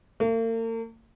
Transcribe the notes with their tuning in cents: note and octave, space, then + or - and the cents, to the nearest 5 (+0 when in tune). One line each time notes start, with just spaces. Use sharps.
A#3 -45